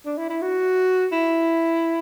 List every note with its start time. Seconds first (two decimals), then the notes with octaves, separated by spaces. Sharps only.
0.06 D4
0.18 E4
0.30 E4
0.42 F#4
1.12 E4